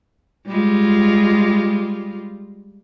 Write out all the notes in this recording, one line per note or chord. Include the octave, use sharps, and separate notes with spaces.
G3 G#3 F4